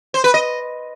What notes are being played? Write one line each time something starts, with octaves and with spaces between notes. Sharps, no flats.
C5
B4
D#5